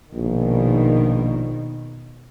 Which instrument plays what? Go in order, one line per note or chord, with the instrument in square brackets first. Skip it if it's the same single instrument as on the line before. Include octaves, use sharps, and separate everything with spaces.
[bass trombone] A#1 [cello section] B2 D#3